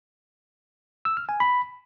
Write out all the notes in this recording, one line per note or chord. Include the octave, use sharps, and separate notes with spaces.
E6
F6
G#5
B5